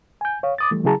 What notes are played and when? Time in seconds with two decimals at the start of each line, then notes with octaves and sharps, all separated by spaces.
0.21 G#5 G6
0.43 C#5 F5
0.58 D6 D#6 A6
0.71 E3 G3 A3
0.84 C#3 F#3 E4 G#4 A5 A#5